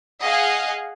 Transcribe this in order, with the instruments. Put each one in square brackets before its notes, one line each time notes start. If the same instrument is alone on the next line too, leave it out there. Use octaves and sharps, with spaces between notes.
[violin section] G#4 D#5 F5 F#5 G#5